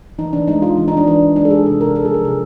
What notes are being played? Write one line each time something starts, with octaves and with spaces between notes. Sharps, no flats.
E3 D#4
E3 D4
G#3 D#4
G#3 F4
E3 D#4
D#4
E3 D4
E3 D4
E3
G#3 D4
A4
G#3 G#4
C3 A4
C3 A#4
G#3 A4
G#4
F3 A#4
C3 G#4